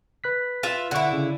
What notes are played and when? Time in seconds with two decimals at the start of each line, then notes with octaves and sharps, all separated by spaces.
0.24 B4 F#6 B6
0.63 F4 E5
0.91 D3 E4 F#5 C#6
1.13 C#3